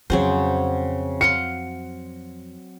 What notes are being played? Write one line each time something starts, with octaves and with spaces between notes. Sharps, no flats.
F2 C#3 F#3 C4 F#4 G#4 C5
F5 F#5 C6 C#7